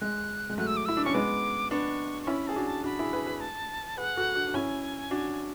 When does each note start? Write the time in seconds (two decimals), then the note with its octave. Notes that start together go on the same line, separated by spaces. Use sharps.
0.01 G#3 F#6
0.50 G#3
0.58 F#3 A3 F#6
0.67 E6
0.77 D6
0.85 E4 E6
0.97 D4
1.05 C#4 C#6
1.14 G#3 B3 D6
1.71 B3 D4 C#6
2.23 C#6
2.27 C#4 E4 B5
2.47 G#4 A5
2.56 D4 F#4
2.66 A5
2.84 D4 F#4 B5
2.99 E4 G#4
3.13 G#4 B4
3.26 G#4 B4
3.41 A5
3.97 G#4 B4 F#5
4.16 F#4 A4
4.35 D4 F#4
4.47 D4
4.54 C#4 E4 G#5
5.11 D4 F#4